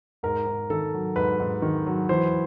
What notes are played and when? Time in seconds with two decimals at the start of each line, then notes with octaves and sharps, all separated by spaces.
0.23 G#2 A#4
0.46 G#2
0.70 D#3 A4
0.94 F#3
1.16 G#2 B4
1.40 G#2
1.62 D#3
1.86 F#3
2.09 E3 C5